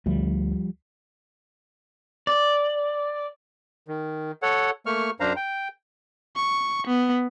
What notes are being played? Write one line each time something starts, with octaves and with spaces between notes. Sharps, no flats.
D2 F3 G3
D5
D#3
A4 C#5 F#5
A3 A#3 C#6 F6
F#2 D4 C5 F5 A#5
G5
C#6
B3